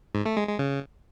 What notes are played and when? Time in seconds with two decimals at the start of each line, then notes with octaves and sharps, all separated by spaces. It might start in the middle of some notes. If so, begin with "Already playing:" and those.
0.15 G#2
0.26 A3
0.37 G#3
0.48 G#3
0.59 C#3